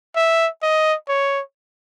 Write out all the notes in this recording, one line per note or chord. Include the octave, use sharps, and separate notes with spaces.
E5
D#5
C#5